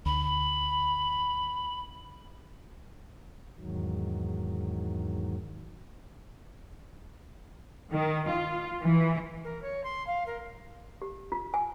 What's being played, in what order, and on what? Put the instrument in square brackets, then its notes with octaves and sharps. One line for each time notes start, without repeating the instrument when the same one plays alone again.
[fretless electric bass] D2 [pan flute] B5
[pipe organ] E2 G#2 D#3 F#3
[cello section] D#3
F4
E3
[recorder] A#4
C#5
C6
F5
A#4
[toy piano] G4
F4
G#5